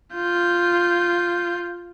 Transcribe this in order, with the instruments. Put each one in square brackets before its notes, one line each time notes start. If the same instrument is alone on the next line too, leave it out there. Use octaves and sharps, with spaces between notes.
[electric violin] F4 G6